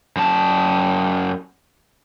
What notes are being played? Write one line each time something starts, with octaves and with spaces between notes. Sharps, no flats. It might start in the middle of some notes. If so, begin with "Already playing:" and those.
F#2 A5